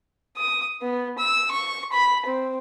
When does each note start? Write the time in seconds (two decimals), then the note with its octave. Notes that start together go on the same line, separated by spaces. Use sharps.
0.37 D#6
0.82 B3
1.18 E6
1.51 C#6
1.92 B5
2.26 C4